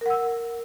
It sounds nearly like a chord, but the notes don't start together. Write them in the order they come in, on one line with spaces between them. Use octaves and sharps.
A#4 F#5 E6